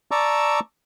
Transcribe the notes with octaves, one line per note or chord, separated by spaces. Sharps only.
D5 A5 A#5 C#6 D6 E6